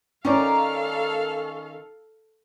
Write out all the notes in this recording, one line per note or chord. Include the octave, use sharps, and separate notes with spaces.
D#3 C#4 A4 A#4 D5 F5